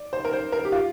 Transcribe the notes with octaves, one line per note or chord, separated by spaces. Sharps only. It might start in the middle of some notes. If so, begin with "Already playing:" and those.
Already playing: D5
C5
A#4
C5
A#4
G4
F4